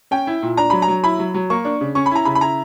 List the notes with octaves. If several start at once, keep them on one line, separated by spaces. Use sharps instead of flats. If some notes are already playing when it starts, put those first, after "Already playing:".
C#4 G5
E4
A#2
D4 A#5
F#3 B5
A#5
F#3
E4 B5
F#3
F#3
A#3 C#6
D4
C#3
C#4 C#6
B5
E4 A#5
C#3 B5
B5
E4 A#5